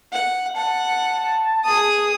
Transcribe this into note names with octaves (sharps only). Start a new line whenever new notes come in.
F#5
F#5 A5
G#4 D#6